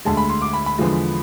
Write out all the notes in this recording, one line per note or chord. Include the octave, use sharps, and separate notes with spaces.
D2 D3 G#3 A5
B5
C6
D6
B5
B5
E2 D3 F3 G#3